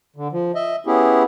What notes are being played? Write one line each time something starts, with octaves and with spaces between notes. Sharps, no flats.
D3
F3
D#5 E5
B3 C#4 E4 G4 G#4